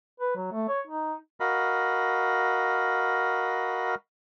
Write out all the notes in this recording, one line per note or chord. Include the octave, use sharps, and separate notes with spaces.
B4
F#3
A3
C#5
D#4
F#4 A#4 D#5 F5 B5